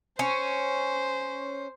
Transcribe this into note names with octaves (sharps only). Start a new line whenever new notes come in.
C#4 C5